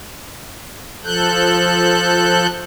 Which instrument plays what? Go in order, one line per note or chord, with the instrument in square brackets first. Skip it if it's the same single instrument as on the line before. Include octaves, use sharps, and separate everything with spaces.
[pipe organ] F3 A4 F#6 G6